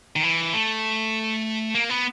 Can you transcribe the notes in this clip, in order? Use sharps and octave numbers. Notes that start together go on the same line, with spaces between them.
D#3
E3
A3
A#3
B3